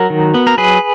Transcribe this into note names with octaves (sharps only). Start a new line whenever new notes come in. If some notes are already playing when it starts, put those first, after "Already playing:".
Already playing: F#3 F#4 A#4
D#3
B3
A#4
F#3 G#4 B4